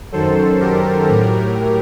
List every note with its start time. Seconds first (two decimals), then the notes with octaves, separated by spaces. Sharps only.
0.12 F#2 D#3 F#3 A4 C5
0.60 G4 A#4
1.08 A2 F#3 G4 A#4